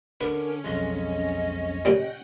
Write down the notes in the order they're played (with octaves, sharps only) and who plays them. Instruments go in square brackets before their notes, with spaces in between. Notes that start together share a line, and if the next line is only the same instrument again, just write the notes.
[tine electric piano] D3 [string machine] C#4 [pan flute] A#4 [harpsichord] B4
[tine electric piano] B1 F2 G#3 [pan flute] D#5
[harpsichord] A#2 C#3 G3 [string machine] F#5 G5